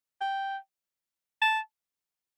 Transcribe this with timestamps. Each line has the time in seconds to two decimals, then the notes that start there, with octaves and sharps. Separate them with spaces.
0.21 G5
1.42 A5